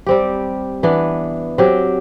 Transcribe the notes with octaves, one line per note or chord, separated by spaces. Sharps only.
G3 C4 G4
E3 B3 D4
F#3 C4 G4